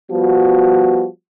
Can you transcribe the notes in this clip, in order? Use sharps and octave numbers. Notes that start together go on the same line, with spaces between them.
F3 G3 B3 F#4